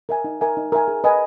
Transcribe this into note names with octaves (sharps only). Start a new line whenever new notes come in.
A#4 E5 G#5
D#4
A#4 E5 G#5
D#4
A#4 E5 G#5
G#4
B4 D#5 G#5